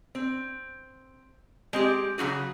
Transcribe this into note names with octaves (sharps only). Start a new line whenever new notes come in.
C4
G#3 C4 G4
C#3 F#3 E4 F#4 G#4